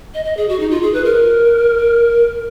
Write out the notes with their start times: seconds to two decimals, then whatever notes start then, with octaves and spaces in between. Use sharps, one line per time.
0.14 D#5
0.25 D#5
0.37 G#4
0.49 F#4
0.60 D#4
0.71 F4
0.82 G#4
0.94 B4
1.05 A#4